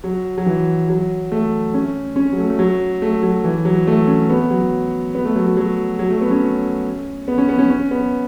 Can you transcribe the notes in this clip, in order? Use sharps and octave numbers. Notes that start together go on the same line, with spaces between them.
F#3
F#3
E3
F#3
A3
C#4
C#4
F#3
A3
A3
F#3
A3
F#3
E3
F#3
A3
C#4
B3
F#3
B3
A3
F#3
F#3
F#3
F#3
A3
B3
C#4
B3
C#4
B3
C#4
C#4
B3